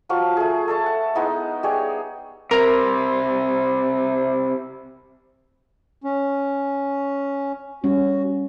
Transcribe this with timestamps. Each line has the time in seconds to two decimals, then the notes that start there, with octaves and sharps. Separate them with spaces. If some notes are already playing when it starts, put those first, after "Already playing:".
0.09 F3 F#3 F5 C#6
0.37 A3 G#4
0.68 A4 E5 A5 C#6
0.86 F#5
1.15 G#3 B3 D#4 E4
1.63 G3 G#4 C#5
2.51 C3 E4 A#4
6.04 C#4
7.84 G3 C#4 F#4